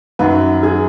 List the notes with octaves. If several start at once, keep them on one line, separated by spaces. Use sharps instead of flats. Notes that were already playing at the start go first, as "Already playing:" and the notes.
F#2 D#3 F#3 B4
G#4